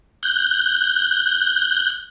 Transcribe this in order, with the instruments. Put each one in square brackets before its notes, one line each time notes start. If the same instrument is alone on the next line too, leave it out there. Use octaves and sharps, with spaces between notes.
[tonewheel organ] F#6 G6